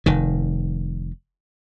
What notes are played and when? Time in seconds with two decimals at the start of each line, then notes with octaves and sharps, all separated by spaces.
0.06 F1 D#3